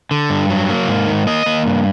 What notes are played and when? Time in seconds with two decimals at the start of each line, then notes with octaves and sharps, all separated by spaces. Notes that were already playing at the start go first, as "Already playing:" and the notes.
0.11 D3
0.30 G2
0.50 F#3
0.69 A#3
0.87 G#2
1.07 D#3
1.27 A#3 D#5
1.46 A#3
1.66 G2